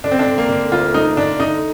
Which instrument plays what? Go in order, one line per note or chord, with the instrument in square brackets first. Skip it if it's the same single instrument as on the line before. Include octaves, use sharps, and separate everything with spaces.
[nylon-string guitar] D3 [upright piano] D4
[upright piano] C4
D4
[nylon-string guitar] D3
[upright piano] A#3
[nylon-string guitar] D3
[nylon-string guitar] D2 [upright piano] F4
[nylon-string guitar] A3 [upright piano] D#4
[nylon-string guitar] D3 [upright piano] D4
[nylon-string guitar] D3 [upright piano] D#4